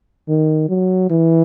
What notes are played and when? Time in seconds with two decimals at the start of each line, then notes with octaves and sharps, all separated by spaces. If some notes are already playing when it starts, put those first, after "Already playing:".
0.29 D#3
0.69 F#3
1.10 E3